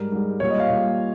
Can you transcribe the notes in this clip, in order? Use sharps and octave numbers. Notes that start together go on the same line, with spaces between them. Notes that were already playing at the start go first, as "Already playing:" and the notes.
Already playing: G#2 G3 A#4
G#2 G3
A#2 G3 C#5
D#5
F5
A#2 G3